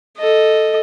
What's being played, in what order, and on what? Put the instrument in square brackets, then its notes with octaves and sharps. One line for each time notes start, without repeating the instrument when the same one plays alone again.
[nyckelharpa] A4 D#5